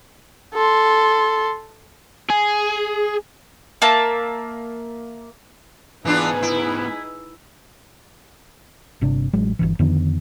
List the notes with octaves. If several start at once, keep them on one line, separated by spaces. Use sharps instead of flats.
A4 C6
G#4
A#3 E5 A5
G#2 E3 B3 D4 D#4 F4 G#4 B4
E4
G1 C3 D4
A1 F#3 G#3
G1 C2 E3
F2 D3 D#3 B3